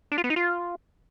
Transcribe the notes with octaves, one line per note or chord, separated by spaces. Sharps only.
D4
F4
B3
D#4
F4